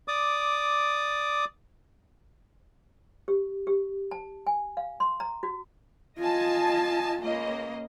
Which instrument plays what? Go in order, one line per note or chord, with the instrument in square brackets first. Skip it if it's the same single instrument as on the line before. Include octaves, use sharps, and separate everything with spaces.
[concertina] D5 D6 D#6
[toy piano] G4
G4
A5
G#5
F5
C6
A#5
F#4
[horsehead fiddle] F4 [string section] D#5 G#5 A5
[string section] C#2 A#3 D#5